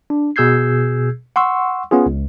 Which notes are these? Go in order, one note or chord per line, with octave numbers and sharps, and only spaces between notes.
D4
B2 G#4 E6 G6 G#6 C7
F#5 C6 C#6 E6
B3 C#4 F4 G#4
C#2